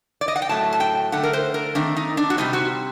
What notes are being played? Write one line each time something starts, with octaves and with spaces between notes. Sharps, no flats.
D5
D#5
F#5
G5
A2 F#3 A3 A5
A5
G5
D3 A3 D4 F#5
A#4
C5
A#4
D#3 A3 C4 D4
D#4
D4
F#4
C3 G3 C4 D#4
F#4